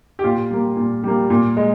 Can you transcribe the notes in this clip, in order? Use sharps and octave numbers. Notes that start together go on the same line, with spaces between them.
G4
A#2 F4
G3 A#3
A#2
G3 A#3
A#2
G#3